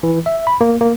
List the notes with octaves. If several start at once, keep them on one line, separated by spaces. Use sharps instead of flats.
E3
E5
B5
A#3
A#3